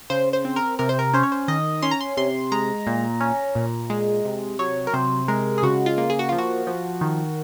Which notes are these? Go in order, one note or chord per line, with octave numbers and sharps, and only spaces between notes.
C#3 C5
C5
C4
A#4
C3 A#4
C5
A#4
C#4 C5
C#5
C5
D#3 D#5
C#4 C6
A#5
C6
C3 C6
G#3 A#5
A#2
C#4
A#2
G#3
C3
F#3 C#5
A#4
C3 C5
G#3 A#4
G#4
C#3 F#4
F4
A#3
G#4
F#4
F3 F4
F#4
F3
D#3